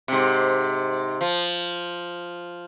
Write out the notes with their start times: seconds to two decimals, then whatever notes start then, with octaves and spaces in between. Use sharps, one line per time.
0.08 G#2 C3
1.21 F3